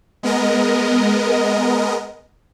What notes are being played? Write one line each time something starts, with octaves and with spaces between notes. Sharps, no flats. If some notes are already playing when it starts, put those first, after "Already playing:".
G#3 B3 A#4 D#5